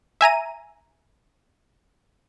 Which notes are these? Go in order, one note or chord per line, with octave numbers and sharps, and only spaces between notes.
E5 G#5 A#5 D#7